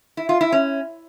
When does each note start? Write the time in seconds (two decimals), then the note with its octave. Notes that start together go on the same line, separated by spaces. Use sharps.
0.17 E4
0.29 F4
0.41 E4
0.52 C#4